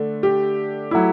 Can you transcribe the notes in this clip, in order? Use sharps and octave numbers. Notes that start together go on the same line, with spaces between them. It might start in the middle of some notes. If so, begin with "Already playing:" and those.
Already playing: D3 A3 D4
G4
F#3 A3 E4